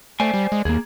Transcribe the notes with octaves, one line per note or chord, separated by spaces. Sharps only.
A3 C5 D5 G#5
G3
G#3
D#2 A#3 G#4